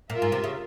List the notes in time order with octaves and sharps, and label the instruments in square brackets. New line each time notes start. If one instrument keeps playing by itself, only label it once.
[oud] A#2 [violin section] F4 A#4 E5
[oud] G#2
C3
C#3